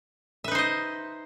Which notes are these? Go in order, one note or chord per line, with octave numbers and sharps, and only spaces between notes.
D#4 B4 C5 D#5 E5